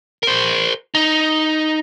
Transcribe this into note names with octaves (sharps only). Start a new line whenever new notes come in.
A#4 C5
D#4